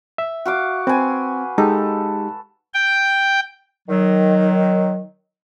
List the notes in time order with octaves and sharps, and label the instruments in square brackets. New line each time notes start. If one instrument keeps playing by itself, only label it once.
[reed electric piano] E5
[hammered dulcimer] F#4 F5 D6
[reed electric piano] C4 [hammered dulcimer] B4 G#5
[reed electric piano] G#3 D#4 G4 [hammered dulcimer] A4
[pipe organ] G5
[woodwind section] D#3 F#3